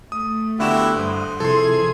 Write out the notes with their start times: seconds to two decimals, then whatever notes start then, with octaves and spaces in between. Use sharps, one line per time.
0.12 A3 D#6
0.60 D3 B3 E4 F#4 G4 E7
0.97 G2 C5 F#5 D#6
1.40 C3 F3 E4 G#4 A4 C6 G#6